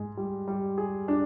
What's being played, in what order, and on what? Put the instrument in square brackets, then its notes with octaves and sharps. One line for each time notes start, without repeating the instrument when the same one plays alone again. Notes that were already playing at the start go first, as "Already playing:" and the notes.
Already playing: [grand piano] G#2 G#4
G3
G3
G#4
D4